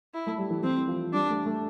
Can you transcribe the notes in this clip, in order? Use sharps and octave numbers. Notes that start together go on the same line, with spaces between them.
E4
A3
G3
E3
E3 C4
F3
G3 D4
A3
A3